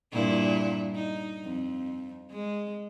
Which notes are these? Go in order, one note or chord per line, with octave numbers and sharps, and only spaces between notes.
G2 A#2 E4
D#4
F2
G#3